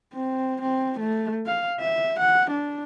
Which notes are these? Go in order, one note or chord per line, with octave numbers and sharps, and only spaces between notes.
C4
C4
A3
F5
E5
F#5
D4